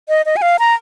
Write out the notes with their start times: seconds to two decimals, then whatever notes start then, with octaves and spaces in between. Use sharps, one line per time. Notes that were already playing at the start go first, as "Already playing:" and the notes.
0.09 D#5
0.26 D#5
0.36 G#5
0.42 F5
0.59 A#5